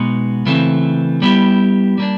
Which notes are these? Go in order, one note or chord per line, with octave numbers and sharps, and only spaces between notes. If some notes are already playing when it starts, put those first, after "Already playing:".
Already playing: B2 G#3 B3 D#4 F#4
C#3 E3 A3 C4
G3 B3 E4 G4
G3 A#3 D4